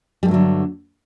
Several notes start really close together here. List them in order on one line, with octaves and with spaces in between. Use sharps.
G3 G2 A3 F#3 D3